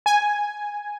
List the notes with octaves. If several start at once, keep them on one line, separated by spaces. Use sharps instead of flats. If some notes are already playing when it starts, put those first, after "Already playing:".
G#5